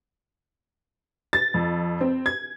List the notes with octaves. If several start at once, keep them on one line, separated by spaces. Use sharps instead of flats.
A6
F2
C4
G#6